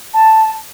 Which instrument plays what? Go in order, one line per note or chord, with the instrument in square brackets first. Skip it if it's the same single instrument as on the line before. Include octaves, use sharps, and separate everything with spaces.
[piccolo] A5